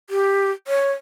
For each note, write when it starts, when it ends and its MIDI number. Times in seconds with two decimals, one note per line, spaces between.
0.10 0.51 67
0.68 0.92 73